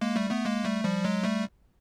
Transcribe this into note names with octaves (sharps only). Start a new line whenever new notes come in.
G#3 A#3
G3 A3
A3 B3
G#3 A#3
G3 A3
F3 G3
F#3 G#3
G3 A3